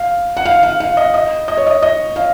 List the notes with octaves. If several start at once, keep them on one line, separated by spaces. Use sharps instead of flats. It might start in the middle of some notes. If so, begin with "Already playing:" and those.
Already playing: F5
F#5
F5
F5
F5
D#5
D#5
D#5
C#5
D#5
D#5
F5